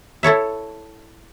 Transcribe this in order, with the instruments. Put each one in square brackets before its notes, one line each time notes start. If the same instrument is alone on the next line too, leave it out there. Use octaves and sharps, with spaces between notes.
[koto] E4 A4 C#5 E5